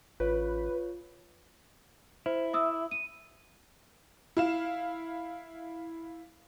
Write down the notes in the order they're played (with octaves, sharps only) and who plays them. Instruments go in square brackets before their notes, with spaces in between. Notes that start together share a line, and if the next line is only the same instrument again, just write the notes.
[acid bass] A1 [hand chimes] F4 C#5 [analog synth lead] B4
[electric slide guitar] E4 [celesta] C5
[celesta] E5 D#6 E6
D#7
[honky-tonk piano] E4 F5 E7